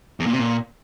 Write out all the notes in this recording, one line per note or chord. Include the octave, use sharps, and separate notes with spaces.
E2
A#2
C3
A#2